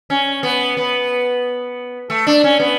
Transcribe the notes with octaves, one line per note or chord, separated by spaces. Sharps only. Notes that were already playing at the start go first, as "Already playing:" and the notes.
C#4
B3
B3
A3
D4
C#4
B3